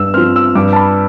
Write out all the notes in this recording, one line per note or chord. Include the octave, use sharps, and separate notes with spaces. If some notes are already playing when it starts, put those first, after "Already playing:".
Already playing: G2 E6
F3 C4 F6
E6
G2 D6
A5
B5